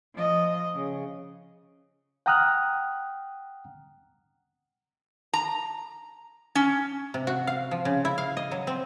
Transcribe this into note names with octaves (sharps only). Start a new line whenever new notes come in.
F3 D#5
C#3
F#5 G5 A#5 D#6 F6 F#6
A#5
C#4
C3
F#4
F5
F3
C#3
E4
F5
D#5
F#3
C4